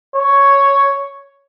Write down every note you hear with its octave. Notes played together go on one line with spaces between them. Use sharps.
C#5